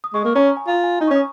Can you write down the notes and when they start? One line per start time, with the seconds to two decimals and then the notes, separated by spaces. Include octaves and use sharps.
0.04 D#6
0.14 G#3 C#6
0.25 A#3 C#6
0.35 C#4 A#5
0.46 A#5
0.57 G#5
0.67 F4 A#5
0.84 G#5
1.00 D#4 A#5
1.07 C#4 C#6
1.15 D#6